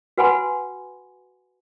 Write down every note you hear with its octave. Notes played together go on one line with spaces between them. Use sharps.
F#4 B4 F#5 G#5 B5 C6